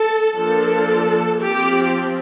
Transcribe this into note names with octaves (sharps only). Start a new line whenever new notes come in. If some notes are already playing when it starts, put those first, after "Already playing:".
Already playing: A4
F3 A#3 D4 A4
F3 C4 G4